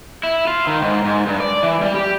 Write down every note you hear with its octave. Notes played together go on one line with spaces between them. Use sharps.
E4
F4
D#3
G#2
G#2
G2
D5
E3
G3
G4